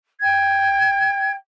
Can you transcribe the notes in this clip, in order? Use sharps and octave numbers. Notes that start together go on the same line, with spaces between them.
G5 G#6